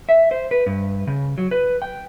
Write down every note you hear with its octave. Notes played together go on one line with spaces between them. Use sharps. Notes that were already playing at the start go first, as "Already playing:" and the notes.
E5
C5
B4
G2
C#3
F#3
B4
G5